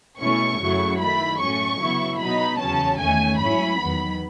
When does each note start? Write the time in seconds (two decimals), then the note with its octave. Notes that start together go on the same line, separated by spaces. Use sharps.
0.20 B2 A3 C#4 E4 C#6
0.60 F#2 C#3 F#3 A3 E4
1.00 D#3 A3 E4 B5
1.39 A2 F#3 A3 C#4 C#6
1.79 C#3 F#3 B3 E4
2.20 B2 F#3 B3 D#4 B5
2.59 E2 C#3 F#3 C#4 A5
2.99 E2 D#3 A3 C#4 G#5
3.39 G#2 F#3 C#4 E4 B5
3.79 E2 D#3 F#3 B3